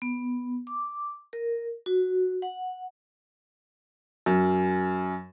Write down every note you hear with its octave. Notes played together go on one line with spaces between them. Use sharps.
B3
D6
A#4
F#4
F#5
F#2